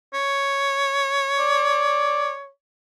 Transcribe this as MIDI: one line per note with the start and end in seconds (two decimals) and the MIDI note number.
0.14 2.48 73
1.39 2.31 74